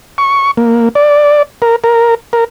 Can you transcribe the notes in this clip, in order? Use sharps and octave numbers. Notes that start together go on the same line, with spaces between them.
C#6
A#3
D5
A#4
A#4
A#4